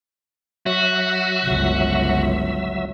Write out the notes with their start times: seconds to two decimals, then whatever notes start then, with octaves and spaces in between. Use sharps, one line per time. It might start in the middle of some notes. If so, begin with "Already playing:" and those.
0.66 F#3 F#4 E5
1.44 G1 C#2